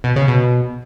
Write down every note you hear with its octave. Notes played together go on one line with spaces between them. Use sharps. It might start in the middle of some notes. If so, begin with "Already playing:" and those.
B2
C#3
B2